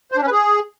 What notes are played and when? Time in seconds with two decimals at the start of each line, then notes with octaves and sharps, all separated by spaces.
0.12 C5
0.17 D4
0.22 C#4
0.27 B4
0.32 G#4